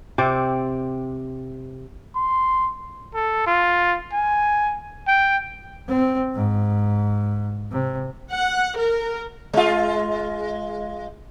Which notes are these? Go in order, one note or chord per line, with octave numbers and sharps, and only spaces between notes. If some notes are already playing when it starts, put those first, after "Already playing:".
C3 C4 D5
C6
A4
F4
G#5
G5
C4
G#2
C3
F#5
A#4
G#3 F4